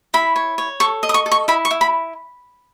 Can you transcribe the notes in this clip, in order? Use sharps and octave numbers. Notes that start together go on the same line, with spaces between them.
E4 B5
C#5
C#5
A4 C#6
D#5
D#6
C#6
A4
C#6
E4 B5
C#6
E4
B5